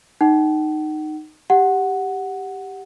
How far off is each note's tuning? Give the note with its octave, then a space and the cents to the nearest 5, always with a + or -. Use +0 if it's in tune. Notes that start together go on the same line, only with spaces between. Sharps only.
D#4 -10 F#5 +40
G4 +0 F#5 +0